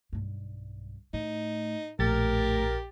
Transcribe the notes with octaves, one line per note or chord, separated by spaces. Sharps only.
B1 G2
A2 D#4
A#1 E2 A2 G4 A#4 A6